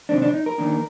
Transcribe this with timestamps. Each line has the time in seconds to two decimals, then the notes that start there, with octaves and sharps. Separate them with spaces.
0.09 C3 D#3 G#3 C4 D4
0.22 D4
0.34 D#4
0.46 A#4
0.58 D#3 A#3 D4